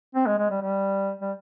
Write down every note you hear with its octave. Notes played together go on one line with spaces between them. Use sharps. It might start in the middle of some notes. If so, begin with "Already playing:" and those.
C4
G#3
G#3
G3
G3
G3